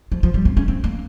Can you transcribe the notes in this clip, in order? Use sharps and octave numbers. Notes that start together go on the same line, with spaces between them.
F3
F3
G3
C4
C#4
C4
A#3